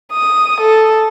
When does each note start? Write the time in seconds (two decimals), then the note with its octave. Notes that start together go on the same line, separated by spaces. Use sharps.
0.12 D#6
0.61 A4